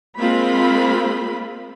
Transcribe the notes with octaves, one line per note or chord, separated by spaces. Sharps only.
G#3 A#3 C4 F4 B5